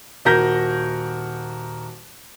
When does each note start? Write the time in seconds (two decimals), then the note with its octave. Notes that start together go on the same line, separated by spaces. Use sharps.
0.25 D#1 F#4 A#4 G6 A#6